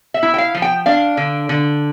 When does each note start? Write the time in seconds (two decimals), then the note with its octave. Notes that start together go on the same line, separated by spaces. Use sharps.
0.14 E5
0.23 E4
0.34 G5
0.38 F5
0.54 F3
0.62 G5
0.86 D4 F5
1.17 D3
1.49 D3